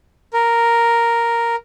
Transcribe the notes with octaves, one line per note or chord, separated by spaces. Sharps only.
A#4